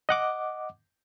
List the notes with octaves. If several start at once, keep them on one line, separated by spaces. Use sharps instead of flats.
D#5 F#5 D6